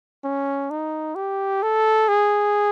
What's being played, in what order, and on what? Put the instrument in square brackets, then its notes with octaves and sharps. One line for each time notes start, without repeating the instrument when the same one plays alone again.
[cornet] C#4
D#4
G4
A4
G#4